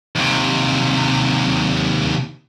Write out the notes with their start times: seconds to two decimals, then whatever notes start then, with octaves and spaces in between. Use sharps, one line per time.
0.15 D#2 C3